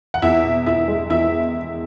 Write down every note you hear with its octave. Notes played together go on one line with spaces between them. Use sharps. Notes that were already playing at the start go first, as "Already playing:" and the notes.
F#5
E2 E4 E5
B2
E2 E4 E5
G#3
E2 E4 E5